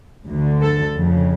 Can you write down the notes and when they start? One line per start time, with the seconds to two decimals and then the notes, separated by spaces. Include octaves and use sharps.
0.27 D2 D3
0.62 A4
0.95 F2 C#3